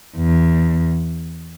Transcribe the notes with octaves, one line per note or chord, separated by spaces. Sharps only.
E2